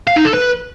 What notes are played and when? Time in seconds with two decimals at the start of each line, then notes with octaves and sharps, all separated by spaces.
0.07 F5
0.16 D#4
0.25 A4
0.34 B4